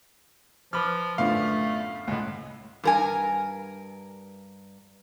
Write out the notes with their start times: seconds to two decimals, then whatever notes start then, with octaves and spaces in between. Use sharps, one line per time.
0.73 F3 B4 B5 D6 F6
1.18 F#2 A2 D3 A3 B3 D4 F4 F5
2.08 C#2 A2 D#5 F#5
2.84 G2 A#4 G#5